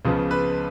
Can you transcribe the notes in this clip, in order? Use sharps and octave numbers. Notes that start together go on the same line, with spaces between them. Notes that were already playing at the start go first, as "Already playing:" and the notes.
C#2 C#3 F3 B3
B4